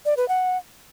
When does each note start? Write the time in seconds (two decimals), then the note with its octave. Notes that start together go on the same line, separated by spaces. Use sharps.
0.06 D5
0.17 B4
0.28 F#5